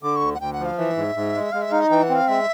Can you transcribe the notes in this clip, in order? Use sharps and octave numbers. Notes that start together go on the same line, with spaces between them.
D3 D6
C#6
D2
F#5
D2 G5
F#5
F3
F5
E3 E5
G#2
G#2
G#3
G#3 F5
E5
D#4 F5
D#5
E3 G5
F#5
C4
F5
G#3 E5